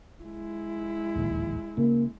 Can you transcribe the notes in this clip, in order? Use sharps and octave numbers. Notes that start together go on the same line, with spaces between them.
G#3 E4
D1 A#1 D#2
C#3 A#3